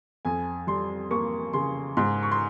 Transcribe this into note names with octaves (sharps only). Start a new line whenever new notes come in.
F2 G#5
G3 C6
A#3 C#6
C#3 C6
G#2 C6
C#6
C6